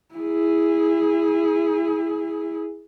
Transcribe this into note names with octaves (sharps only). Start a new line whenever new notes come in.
E4 G#4